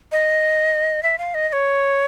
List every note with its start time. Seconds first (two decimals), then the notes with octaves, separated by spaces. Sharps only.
0.12 D#5
1.03 E5
1.18 F5
1.34 D#5
1.49 D#5
1.53 C#5